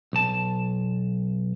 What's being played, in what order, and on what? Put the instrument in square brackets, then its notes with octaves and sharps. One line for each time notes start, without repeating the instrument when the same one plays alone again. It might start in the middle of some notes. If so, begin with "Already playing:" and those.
[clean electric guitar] B1 A5